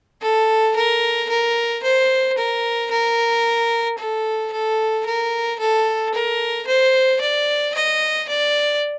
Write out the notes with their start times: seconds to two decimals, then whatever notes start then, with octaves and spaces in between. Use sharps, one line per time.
0.22 A4
0.76 A#4
1.29 A#4
1.83 C5
2.37 A#4
2.91 A#4
3.98 A4
4.52 A4
5.06 A#4
5.59 A4
6.14 A#4
6.67 C5
7.21 D5
7.75 D#5
8.29 D5